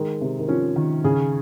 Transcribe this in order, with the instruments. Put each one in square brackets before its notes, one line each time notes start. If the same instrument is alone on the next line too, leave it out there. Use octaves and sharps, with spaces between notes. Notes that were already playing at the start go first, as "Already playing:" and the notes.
Already playing: [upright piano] D#3 [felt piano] G#3
[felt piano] C3
[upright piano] D#3
[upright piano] F3 [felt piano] C#4
[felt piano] D#3
[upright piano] C#3 [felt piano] G#4